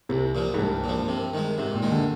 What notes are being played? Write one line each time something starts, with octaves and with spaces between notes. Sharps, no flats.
C2 C3
A#2 F3
G#2
C2 G2
A#2 F3
C3
D#3 G#3
G#2 C3
A#2
D#3 G#3
D3